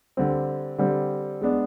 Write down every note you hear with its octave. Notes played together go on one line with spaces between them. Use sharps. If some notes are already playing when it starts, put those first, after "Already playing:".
D3 G3 C4
D3 G3 C4
G#3 B3 D4